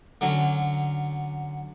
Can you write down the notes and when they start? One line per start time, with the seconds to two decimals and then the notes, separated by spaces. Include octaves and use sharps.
0.21 D3 F#3 C#4